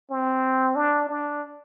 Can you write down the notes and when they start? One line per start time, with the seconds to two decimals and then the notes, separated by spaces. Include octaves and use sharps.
0.11 C4
0.76 D4
1.09 D4